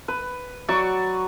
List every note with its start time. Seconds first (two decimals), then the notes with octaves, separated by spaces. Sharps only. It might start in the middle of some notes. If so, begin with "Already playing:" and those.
0.08 B4
0.69 F#3 F#4 D5 C#6